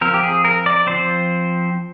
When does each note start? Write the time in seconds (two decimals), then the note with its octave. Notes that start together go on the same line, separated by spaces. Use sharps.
0.01 F3 C4 A#4
0.14 G4
0.23 G#4
0.45 A#4
0.66 D5
0.87 F3 C4 C5